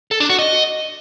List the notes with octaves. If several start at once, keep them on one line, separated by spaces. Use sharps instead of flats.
A4
D4
F#4
D#5